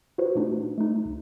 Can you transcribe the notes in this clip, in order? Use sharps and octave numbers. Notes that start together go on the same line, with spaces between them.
F4 F#4 B4 C5
A#2 A3 D4 D#4 F#4
A3 D#4
C2